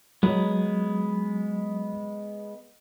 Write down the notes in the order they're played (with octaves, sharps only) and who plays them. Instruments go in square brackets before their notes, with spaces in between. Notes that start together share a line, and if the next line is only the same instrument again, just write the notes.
[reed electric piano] F#3 [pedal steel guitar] G#3 B3